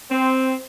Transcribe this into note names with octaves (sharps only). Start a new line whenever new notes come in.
C4